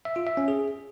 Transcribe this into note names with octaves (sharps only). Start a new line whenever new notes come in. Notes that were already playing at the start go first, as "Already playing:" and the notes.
E5
F4
E5
C#4
G#4